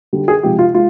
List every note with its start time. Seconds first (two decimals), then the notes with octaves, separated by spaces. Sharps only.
0.13 D3 G3
0.28 G#4
0.43 C3 F3 G#3 G4
0.59 F4
0.74 G#3 F4